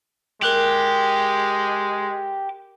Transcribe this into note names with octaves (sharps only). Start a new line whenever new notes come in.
G#3 G4 A#4 F#6 F#7